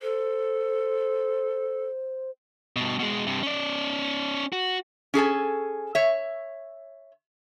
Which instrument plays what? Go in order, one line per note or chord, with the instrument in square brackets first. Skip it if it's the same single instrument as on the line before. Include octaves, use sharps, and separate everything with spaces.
[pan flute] A4 [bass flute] C5
[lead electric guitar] G2 B2
B2 G#3
G2 C3
C#4 D5
F#4
[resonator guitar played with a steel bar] C#4 G#4 A4 G#5
C#5 E5